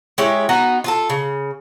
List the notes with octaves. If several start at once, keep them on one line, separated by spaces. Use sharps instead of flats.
G#3 E4 G4 C#5
B3 D#4 F#4
F4 G#4 A4
C#3